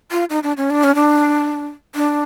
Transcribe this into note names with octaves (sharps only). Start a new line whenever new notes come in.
F4
D#4
D4
C#4
D4
C#4
D4
D4